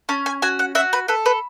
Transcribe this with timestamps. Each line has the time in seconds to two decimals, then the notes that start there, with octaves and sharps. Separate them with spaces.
0.09 C#4 A5
0.26 G#5
0.42 F#4 G#5
0.59 F#5
0.75 F#4 E5
0.93 B4
1.08 A4 B4
1.26 B4